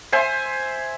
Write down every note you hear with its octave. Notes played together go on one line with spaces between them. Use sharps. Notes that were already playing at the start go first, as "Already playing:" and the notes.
C5 E5 G#5 C6